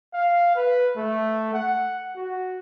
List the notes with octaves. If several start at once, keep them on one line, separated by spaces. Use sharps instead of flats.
F5
B4
A3
F#5
F#4